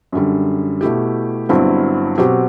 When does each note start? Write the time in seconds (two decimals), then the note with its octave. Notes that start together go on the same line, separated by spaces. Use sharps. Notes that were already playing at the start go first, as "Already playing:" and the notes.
0.12 F#2 D3 G3
0.81 B2 A3 E4 G4
1.49 G1 G2 F#3 C4 E4
2.18 B2 F#3 C4 G4